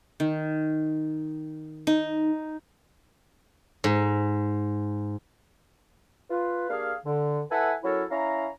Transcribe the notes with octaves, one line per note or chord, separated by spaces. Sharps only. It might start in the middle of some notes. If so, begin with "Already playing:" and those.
D#3
D#4
G#2
F4 B4
A#3 D4 G4 G#4 F5
D3
E4 A4 B4 E5 F#5 G#5
F#3 C#4 E4 A4 A#4 C#5
C#4 E4 F5 A#5